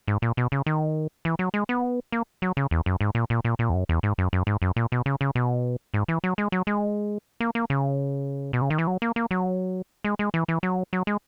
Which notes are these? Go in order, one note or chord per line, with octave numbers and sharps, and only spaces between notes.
G#2
A#2
B2
C#3
D#3
E3
F#3
G#3
B3
A#3
F#3
C#3
E2
F#2
G#2
A#2
A#2
A#2
A#2
E2
F#2
E2
G#2
F#2
F#2
G#2
F#2
A#2
B2
C#3
C#3
B2
G#2
E3
F#3
G#3
F#3
G#3
A#3
A#3
C#3
B2
C#3
D#3
E3
F#3
A#3
A#3
F#3
G#3
G#3
E3
E3
F#3
F#3
G#3